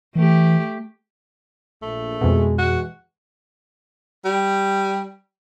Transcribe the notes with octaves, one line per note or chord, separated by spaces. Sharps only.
E3 A3 G4
A#1 A3
F2 B2 G#3
E3 G#3 F#4
G3